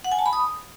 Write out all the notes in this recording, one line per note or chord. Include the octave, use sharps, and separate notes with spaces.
F#5
G#5
A5
B5
D#6